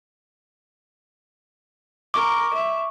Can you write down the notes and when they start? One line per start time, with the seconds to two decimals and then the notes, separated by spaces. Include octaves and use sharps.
2.14 A#4 C#6 D6
2.54 E5